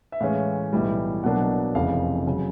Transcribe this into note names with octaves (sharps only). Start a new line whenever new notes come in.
E5
A2 E3 G#3 C#4 F5
B1 A2 E3 G3
B1 B2 F#3 A#3 D4 F#5
F1 F2 C#3 E3 F5
C#3 F#3